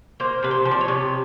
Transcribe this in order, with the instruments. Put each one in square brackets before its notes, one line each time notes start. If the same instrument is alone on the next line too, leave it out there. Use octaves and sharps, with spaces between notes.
[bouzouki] A#3 C5
C3 B4
C5
F3
D5
C#5
C3